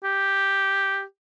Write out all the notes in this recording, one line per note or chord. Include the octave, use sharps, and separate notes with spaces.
G4